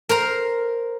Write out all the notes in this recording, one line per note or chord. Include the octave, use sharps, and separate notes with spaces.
A#4 C5 A#5